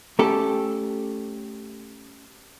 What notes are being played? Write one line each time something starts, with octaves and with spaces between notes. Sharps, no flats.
A3 C#4 G4 A4